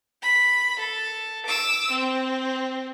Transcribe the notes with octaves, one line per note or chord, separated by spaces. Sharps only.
B5
A4
D6 E6
C4